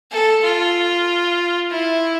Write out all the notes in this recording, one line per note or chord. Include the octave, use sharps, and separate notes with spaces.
A4
F4
E4